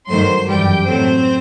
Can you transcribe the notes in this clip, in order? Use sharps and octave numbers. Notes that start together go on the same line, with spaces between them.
G2 D#3 F#3 A3 C5 C6
F#2 E3 G3 G4 G5
A2 F#3 A3 C4 C5